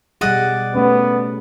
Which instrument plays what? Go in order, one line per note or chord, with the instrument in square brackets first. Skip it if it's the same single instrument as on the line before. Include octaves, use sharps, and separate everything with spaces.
[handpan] B2 G3 G#4 [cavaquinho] D5 D#5 F#5
[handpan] A3 C#4 [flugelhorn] B3